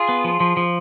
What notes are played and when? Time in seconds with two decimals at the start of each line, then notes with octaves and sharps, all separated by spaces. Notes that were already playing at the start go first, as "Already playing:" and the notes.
Already playing: F4 G#4
0.09 B3
0.24 F3
0.40 F3
0.57 F3